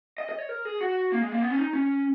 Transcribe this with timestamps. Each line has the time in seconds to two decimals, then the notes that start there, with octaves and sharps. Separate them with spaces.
0.18 D#5
0.29 D#5
0.38 C#5
0.49 A#4
0.65 G#4
0.81 F#4
1.12 A#3
1.22 G#3
1.32 A#3
1.42 B3
1.50 C#4
1.58 D#4
1.73 C#4